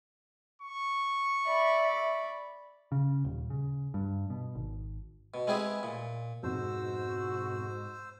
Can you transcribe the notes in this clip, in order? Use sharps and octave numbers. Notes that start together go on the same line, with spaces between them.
C#6
D5 E5 B5
C#3
D#1
C#3
G2
B2
G#1
B2
G#3 B3 C4 E4 G4 G#4
A#2
F2 G#2 B2 F#4 C5 E6